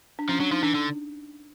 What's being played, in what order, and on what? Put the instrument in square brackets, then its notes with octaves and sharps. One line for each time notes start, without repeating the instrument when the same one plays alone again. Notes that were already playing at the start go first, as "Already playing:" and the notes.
[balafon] D4
[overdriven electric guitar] F3 [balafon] C#4
[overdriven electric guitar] F#3 [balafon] D4
[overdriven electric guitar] F3 [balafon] D#4
[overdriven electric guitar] E3 [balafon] D4
[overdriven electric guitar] D3